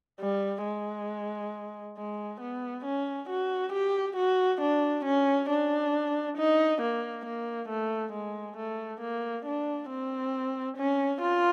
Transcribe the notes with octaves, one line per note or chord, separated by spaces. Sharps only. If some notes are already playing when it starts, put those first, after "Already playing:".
G3
G#3
G#3
B3
C#4
F#4
G4
F#4
D4
C#4
D4
D#4
A#3
A#3
A3
G#3
A3
A#3
D4
C4
C#4
F4